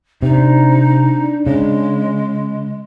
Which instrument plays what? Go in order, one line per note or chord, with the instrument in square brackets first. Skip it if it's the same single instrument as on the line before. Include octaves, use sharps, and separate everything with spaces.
[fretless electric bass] C3 [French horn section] D4 [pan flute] D#4
[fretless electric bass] C#3 [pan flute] G#3